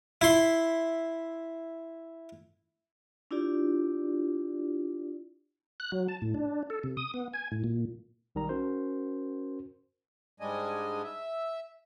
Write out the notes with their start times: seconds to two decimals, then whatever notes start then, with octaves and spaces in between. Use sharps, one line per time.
0.21 E4 C6
3.31 D4 E4 F4 G4 D5
5.80 F#6
5.92 F#3
6.08 A5
6.22 A2
6.34 D4
6.70 A4
6.83 C3
6.97 D#6
7.14 B3
7.33 G#5
7.52 A2
7.64 A#2
8.35 B1 D#3 G3 A#5
8.49 C#4 F#4 A#4 C5
10.40 G#2 G3 G#3 D4 D#5 G#5
11.03 E5